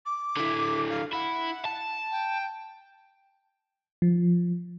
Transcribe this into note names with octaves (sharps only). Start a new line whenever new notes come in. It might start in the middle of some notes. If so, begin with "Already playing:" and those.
D6
D3 E4
F5
E4 F#5
A5
G5
F3